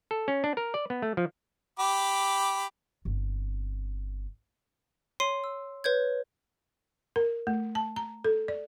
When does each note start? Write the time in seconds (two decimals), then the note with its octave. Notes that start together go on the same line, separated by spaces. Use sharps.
0.11 A4
0.28 C#4
0.44 D4
0.57 A#4
0.74 D5
0.90 B3
1.02 A3
1.17 F3
1.79 G4 B5 D6
3.05 G1 C4
5.20 C#5 C6 C7 D#7
5.44 E6
5.84 B4 C#5 G6 G#6
7.16 A#4
7.47 A3
7.75 A5
7.96 A#5
8.24 A4
8.48 D5